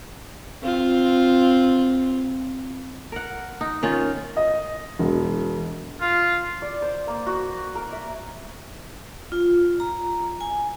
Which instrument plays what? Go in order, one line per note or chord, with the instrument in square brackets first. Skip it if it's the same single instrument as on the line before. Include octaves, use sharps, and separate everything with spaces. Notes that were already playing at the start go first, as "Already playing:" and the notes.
[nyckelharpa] C4 F4
[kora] A#4 F#5
D#4
D#3 C#4 F4
[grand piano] D#5
E1
[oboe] F4
[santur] D5
C5
A#3
F#4
A#4
E5
[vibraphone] F4
A#5
G#5